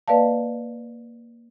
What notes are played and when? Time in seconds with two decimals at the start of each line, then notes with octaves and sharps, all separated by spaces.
0.08 A#3 B4 D5 D#5 F5 A5